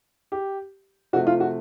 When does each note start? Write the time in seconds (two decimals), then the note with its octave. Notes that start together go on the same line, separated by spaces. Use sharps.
0.32 G4
1.13 C3 F3 A3 F#4
1.27 F4
1.40 F#4